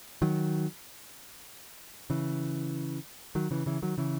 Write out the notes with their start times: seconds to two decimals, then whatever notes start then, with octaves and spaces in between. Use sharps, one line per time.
0.22 D#3 F#3
2.10 C#3 E3
3.35 D#3 F#3
3.51 C#3 E3
3.66 C#3 E3
3.82 D#3 F#3
3.98 C#3 E3